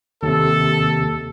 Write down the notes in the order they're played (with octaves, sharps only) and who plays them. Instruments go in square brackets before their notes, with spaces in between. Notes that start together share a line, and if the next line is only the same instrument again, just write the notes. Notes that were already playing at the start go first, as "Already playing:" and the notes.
[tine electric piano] D#2 C3 [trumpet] A4